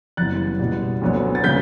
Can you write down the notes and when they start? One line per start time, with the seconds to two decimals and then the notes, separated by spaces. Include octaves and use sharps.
0.17 F#1 F#2 E3 G3 B3 F#6 A6
0.60 E2 B2 G3
1.02 D2 D3 F#3 B3
1.35 A6
1.43 C#3 G3 B3 G6 B6